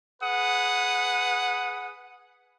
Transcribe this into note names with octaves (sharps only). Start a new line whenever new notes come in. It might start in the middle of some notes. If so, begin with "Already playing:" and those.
G#4 B4 F#5 D#6